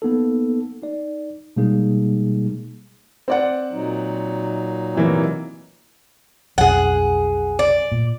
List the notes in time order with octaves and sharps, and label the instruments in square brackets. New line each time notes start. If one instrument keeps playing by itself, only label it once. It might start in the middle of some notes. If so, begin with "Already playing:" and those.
[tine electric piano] A#3 B3 D#4 A4
D#4 D5
B2 G3 G#3 A#3 D#4 G#4
[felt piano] C4 D5 F#5
[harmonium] A#2 F#3 D#4
[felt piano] C3 E3 A#3
[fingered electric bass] B1 F2 [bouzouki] G#4 F#5
[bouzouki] D5
[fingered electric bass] A#2